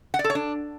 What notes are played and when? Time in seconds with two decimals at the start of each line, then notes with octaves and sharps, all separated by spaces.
0.14 F#5
0.19 D5
0.24 A4
0.30 C#5
0.35 D4